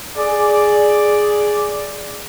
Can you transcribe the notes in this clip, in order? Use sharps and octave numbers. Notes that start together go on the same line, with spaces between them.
G#4 D5